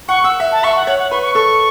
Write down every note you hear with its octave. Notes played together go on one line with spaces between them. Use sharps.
F#5 C#6
F#5 E6
E5
A5
E5 C#6
F#5
C#5 F#5
F#5
B4 C#6
C#6
A4 C#6